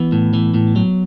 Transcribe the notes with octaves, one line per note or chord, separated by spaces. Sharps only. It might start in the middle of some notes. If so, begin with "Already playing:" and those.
Already playing: E3 B3
A2
E3
A2
F#3